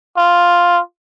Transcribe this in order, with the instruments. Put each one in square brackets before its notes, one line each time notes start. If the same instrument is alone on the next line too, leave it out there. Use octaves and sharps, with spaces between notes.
[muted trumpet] F4